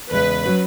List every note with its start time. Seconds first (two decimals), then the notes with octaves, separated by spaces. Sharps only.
0.11 E2 C#3 G#3 B4
0.46 F#3 C#4 F#4